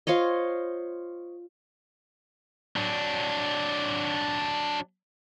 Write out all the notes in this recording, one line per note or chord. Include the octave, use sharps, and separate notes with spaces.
F4 C5 C#5 D#5
F#3 D4